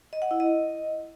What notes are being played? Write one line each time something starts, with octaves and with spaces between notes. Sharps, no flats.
D#5
F#5
E4
D#5